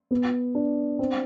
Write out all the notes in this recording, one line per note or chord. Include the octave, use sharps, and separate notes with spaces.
B3
D4
C4